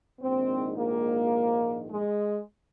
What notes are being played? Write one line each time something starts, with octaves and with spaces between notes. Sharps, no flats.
A#1 G#2 D#3 C4
A#3
G#3